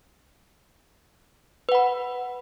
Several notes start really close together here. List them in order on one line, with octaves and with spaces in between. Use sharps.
B4 F#5 B5